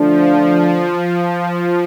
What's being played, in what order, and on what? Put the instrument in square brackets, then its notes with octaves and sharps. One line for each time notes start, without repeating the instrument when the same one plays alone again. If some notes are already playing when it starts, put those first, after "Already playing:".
Already playing: [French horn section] D3 A3 D4 [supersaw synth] F3